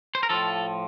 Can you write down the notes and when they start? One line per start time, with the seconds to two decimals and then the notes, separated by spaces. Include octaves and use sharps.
0.15 C5
0.23 A#4
0.29 A2 F3 F4 A4